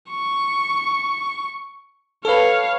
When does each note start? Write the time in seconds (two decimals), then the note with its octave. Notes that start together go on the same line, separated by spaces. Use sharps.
0.11 C#6
2.25 A4 B4 C#5 F5